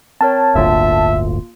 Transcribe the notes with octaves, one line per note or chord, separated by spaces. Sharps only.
C4 A#4 C#5 A5
D1 G1 D2 A#3 F4 E5